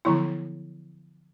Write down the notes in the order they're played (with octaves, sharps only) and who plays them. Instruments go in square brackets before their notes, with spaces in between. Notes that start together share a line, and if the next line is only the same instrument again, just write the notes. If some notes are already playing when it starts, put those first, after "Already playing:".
[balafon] D3 F3 F#3 B3 E4